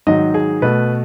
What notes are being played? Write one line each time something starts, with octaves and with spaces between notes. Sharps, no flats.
G#2 D#3 F#3 D#5
G#4
B2 A3 B4